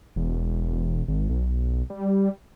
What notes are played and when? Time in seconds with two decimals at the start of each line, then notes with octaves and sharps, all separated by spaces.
0.16 E1
1.08 G#1
1.30 B1
1.90 G3